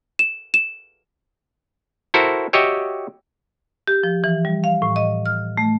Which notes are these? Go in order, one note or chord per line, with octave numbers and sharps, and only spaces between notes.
E7
E7
E4 F#4 A4 A#4 C5
F#4 G4 C#5 D#5 E5 G5
G4
F3
E3
G3
F5
A2
D#5
F6
A3